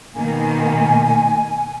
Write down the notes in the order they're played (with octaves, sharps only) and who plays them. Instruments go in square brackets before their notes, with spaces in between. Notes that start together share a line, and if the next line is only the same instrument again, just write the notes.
[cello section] B2 D#3 A#3 [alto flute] G#5